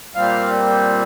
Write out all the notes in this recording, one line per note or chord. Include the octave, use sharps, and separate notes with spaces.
A#2 G3 C4 F5